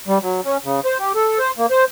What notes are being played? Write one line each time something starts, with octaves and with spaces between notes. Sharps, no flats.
G3
F#3
C#4
C#3
C5
G4
A4
C5
A#3
C5